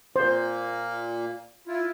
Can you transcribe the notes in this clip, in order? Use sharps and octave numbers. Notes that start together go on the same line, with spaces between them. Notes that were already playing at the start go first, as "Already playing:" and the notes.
A#2 A#3 C5
E4 F4